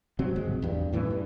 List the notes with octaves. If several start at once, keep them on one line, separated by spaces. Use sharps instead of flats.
C3 F#3 C4
D1 G#1 G#3
E2 G2
F#2 A2 E3 C#4
G2